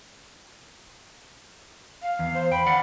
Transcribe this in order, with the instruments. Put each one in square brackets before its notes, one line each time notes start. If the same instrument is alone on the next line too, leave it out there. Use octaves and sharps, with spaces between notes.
[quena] F5
[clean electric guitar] E2
[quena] C5
[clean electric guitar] G5 [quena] B5
[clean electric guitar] D5 F5 F#5